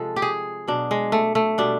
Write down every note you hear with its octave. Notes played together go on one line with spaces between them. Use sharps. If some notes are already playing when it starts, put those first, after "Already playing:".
Already playing: C3 F3 G#3 A4
G4
G#4
B2 F#3 D4
G#3
A3
A3
B2 G3 D4